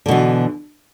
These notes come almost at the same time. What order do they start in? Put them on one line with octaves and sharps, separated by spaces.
D3 B2 E3